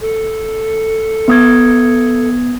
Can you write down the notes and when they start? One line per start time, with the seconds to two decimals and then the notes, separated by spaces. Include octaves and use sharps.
0.01 A4
1.28 B3 D#6 G#6